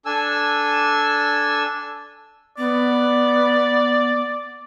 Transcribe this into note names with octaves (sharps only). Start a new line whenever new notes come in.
D4 A4 G#5 E6
B3 D5